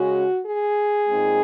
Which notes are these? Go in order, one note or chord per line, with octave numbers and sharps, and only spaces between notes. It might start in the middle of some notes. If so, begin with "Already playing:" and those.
Already playing: C#3 G#3 C#4 F#4
G#4
A#2 G#3 C4 D#4